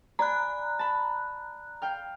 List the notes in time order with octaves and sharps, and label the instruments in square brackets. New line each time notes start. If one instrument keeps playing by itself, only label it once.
[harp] D5 G#5 B5 [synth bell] A#5 F#6
[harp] A5 B5
F5 G5 F6